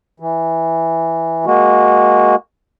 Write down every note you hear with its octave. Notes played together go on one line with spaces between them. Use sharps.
E3
G#3 A#3 F#4